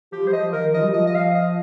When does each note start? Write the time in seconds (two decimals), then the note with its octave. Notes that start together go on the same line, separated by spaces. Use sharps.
0.12 F3 G4
0.24 G3 C5
0.32 F3 D#5
0.53 D#3 A#4
0.74 F3 D#5
0.82 G3
0.90 F3 D#5
1.07 D#5
1.15 F5
1.35 D#5